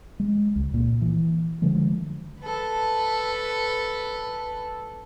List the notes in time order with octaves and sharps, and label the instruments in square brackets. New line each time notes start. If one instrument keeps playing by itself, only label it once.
[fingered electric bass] G#3
C#2
A#2
E3
D3 F3 G#3 A3
[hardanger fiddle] A4 B4